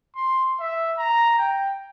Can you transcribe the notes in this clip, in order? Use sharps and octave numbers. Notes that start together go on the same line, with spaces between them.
C6
E5
A#5
G5